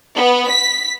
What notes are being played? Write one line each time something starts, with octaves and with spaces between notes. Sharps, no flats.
B3
B6